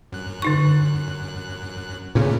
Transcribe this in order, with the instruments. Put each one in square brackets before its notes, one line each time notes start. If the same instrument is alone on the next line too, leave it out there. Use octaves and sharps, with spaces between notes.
[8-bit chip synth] F#2 F#6
[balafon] D3 D#4 C#6
[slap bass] A#2 C#3 [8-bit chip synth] A3 B3 C#4